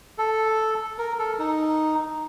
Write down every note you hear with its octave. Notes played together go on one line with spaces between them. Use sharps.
A4
A#4
A4
D#4